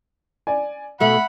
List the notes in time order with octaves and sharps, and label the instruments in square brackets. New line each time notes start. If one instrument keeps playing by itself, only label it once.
[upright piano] D5 G#5
[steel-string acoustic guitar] B2 A3 [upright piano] E5 [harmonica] F#5 B5